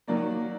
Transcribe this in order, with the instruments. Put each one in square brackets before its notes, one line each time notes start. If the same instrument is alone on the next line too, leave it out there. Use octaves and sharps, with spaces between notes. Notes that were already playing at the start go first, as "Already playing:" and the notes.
[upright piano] D#3 F#3 A#3 D5